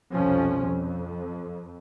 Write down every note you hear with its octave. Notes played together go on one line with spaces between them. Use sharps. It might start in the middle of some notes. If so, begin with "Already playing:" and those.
C2 F2 B2 F3 C#4
F2